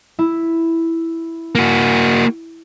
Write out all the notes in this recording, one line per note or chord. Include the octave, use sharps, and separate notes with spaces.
E4
A#3 F#4